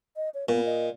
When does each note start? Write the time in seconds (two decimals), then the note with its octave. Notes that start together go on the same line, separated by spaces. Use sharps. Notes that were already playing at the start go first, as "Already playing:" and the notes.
0.16 D#5
0.34 C#5
0.49 A#2 B3
0.65 D#5